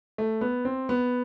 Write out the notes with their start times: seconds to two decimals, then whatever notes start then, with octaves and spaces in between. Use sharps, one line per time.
0.18 A3
0.41 B3
0.65 C4
0.89 B3